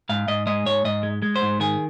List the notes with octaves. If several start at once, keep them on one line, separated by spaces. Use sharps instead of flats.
G#2 F5
G#2 D#5
G#3 D#5
G#2 C#5
G#2 D#5
G#3
G#3
C5
G#2
D#3 G#4